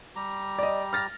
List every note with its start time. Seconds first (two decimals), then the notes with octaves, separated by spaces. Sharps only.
0.16 G3 G4 A#5
0.59 D5 D#5
0.93 F6 A6 A#6